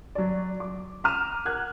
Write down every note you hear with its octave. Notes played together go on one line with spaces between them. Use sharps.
F#3 D5
D6
A#5 D6 F6 D#7 E7
A#4 F#5 F#6 G#6